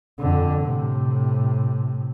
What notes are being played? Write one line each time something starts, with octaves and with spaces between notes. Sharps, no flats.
F2 D3
A2 C3